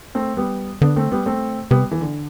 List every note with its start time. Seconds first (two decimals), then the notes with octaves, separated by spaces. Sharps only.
0.15 A3 C4
0.37 G3 B3
0.82 D3 B3 D4
0.96 A3 C4
1.12 G3 B3
1.26 A3 C4
1.71 C3 G3 B3
1.91 E3
2.01 D3